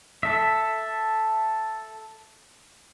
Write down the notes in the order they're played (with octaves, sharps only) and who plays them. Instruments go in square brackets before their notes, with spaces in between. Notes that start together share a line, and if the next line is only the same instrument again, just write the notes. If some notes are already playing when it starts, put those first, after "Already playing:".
[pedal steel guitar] A4 E5